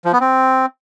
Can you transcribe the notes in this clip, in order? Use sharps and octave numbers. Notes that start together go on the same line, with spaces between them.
F3
B3
C4